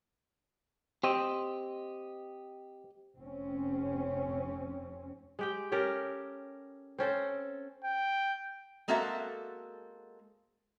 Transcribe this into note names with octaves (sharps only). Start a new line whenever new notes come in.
C4 G4 D#5
F1 C4 C#4
G#3 G4 G5
C#4 G4 A4 A#4
C4 C#4 A4 C5
G5
G#3 A#3 C4 F#4 A4 E5